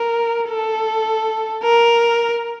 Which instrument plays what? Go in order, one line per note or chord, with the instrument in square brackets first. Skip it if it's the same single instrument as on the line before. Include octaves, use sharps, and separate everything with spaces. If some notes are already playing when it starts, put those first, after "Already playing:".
Already playing: [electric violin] A#4
A4
A#4